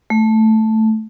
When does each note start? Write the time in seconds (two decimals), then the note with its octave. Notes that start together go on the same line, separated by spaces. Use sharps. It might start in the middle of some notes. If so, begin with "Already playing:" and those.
0.10 A3